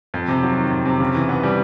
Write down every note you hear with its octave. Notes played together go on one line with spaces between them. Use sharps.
F2
C3
F#3
D#3
F2
C3
C#3
E3
B3
G3